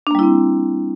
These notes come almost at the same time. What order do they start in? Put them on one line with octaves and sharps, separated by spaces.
D4 A#3 G3 E4 C4